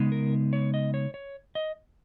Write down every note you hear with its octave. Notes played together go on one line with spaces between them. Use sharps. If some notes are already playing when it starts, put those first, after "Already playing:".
Already playing: C#3 G#3 B3 D#4
A#4
C#5
D#5
C#5
C#5
D#5